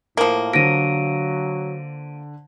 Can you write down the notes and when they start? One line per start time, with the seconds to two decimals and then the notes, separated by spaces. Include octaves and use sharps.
0.17 A2 F3 A#3
0.53 D3 F#3 C5 A#6 D7 D#7